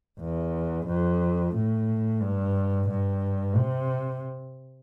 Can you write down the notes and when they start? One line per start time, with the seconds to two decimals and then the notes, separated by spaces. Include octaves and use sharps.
0.20 E2
0.87 F2
1.55 A2
2.22 G2
2.90 G2
3.57 C3